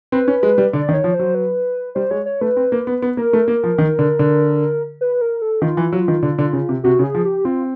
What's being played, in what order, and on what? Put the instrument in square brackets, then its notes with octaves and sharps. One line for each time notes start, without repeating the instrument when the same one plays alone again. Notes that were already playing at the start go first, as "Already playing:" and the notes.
[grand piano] C4 [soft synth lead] B4
[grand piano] C#4
G#3
G3
[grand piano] D3 [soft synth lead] D5
[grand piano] D#3
[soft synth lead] C#5
[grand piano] F3
[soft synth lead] C5
[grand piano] F#3
[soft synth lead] B4
[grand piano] G3 [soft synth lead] C5
[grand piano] G#3 [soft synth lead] C#5
[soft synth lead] C#5
[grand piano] A3 [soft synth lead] B4
[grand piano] C4
A#3
B3
B3
[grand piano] A#3 [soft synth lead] A#4
[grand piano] A3
A#3
F3
D#3
D3
D3
[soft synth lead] B4
A#4
A4
[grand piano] D#3 [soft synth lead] F4
[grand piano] E3
F#3
D#3
D3
D3
C#3
C3
[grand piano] C3 [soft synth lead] F#4
[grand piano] C#3
[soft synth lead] G#4
[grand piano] F3
[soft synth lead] G4
[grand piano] C4 [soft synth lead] F4